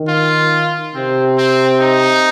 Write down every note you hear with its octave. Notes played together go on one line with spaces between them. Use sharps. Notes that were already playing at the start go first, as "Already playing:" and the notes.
Already playing: D#3
F4
C3 C4
C4
D#4